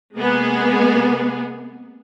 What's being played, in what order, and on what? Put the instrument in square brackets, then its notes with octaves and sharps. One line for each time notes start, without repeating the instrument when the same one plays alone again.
[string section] C3 G#3 A#3 B3 G#4